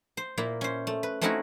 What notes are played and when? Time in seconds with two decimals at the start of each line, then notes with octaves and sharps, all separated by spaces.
0.17 C5
0.38 A#2 A#3 E4
0.61 C#4 C5
0.87 A3
1.03 B4
1.21 A3 C4 C#4 D#4 E4 F#4